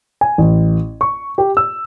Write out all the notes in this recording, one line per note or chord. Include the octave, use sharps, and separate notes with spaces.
G#5
A1
C#6
G4
E6